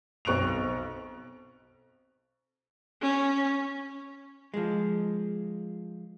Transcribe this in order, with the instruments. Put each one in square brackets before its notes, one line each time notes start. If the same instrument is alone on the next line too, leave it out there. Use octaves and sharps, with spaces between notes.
[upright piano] B1 C4 C#6 F#6 D7 F7
[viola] C#4
[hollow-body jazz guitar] F3 G#3